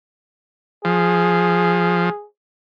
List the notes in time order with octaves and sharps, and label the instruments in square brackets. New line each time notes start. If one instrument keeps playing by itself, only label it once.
[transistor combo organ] F3 [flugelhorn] G#4